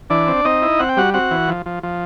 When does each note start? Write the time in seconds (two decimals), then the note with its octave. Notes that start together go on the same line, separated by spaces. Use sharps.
0.10 E3 D4 D5
0.28 C4
0.45 C4 D#4 D#5
0.62 E4
0.80 C4 F#5
0.89 G5
0.97 G3 F#4 F#5
1.14 C4 F#4 F#5
1.31 E3
1.48 F3
1.66 F3
1.83 F3